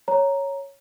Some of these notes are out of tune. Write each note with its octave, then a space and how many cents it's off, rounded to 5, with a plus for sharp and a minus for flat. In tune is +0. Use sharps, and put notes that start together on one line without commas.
C#5 +0 A#5 +0